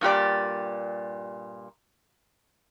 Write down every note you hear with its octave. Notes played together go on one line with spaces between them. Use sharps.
G2 A#2 G4 D5